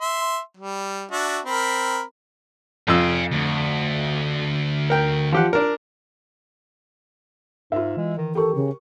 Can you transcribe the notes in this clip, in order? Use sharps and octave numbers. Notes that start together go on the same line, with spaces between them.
E5 C6
G3
D4 F#4 E5
C4 A#4 B5
F2 F5 G#5 E6
D2
A#4 G5
F3 G4 F#5
D4 A#4
G#2 F4 E5
E3 G#3
D#3
D#3 G4 A4 A#4 C#6
C#3